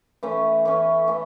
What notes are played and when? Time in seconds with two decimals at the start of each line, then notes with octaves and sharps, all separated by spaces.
0.23 E3 A3 C#4
0.65 E3 A3 C#4
1.08 E3 A3